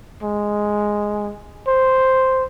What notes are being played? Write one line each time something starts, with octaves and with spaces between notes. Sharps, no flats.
G#3
C5